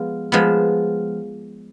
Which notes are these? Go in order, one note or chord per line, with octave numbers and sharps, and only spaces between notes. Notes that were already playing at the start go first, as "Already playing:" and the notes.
Already playing: F3 G#3 B3
F3 G#3 B3